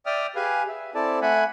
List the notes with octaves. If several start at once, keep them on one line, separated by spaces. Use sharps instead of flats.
D5 E5 G5 D#6 F6
G4 G#4 B4 F5 G#5
E5
C4 E4 A4 D5 A5
A3 F#5 G#5 B5